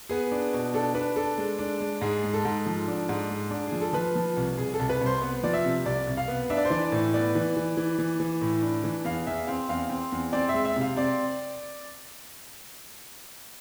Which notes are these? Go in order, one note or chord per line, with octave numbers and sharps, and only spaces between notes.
B3 G#4
D4
B2
D4 A4
D4 B4
D4 A4
G#3
D4
G#3
G#2 G#4
G#3
A4
G#2
F3
D4
G#2
G#3
D4
F3 G#4
A4
F3 B4
F3
C2
C2 G#4
A4
C2
B4
C2
C5
B3
F3 D5
E5
C3
C2 D5
C2
F5
B3
D4 E5
D5
C5
E3 D5
A2
B3 D5
E3
E3
E3
E3
E3
A2
D4
E3
E2 F5
E2 E5
C4 F5
E2 F5
C4
E2
C4 D5
E5
G#3
E5
C3
F5
C4 D5